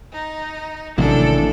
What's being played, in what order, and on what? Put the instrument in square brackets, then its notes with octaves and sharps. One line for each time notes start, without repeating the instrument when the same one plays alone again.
[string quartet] D#4
[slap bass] A1 D#3 [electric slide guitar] C3 F#3 A#3 [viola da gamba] D4 [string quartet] A4